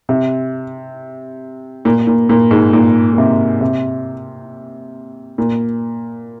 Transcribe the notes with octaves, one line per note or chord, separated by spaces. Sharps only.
C3
A#2
A#2
A#2
G#2
A#2
A#2
C3
C3
A#2